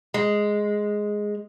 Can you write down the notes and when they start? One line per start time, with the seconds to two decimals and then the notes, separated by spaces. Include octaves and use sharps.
0.14 G#3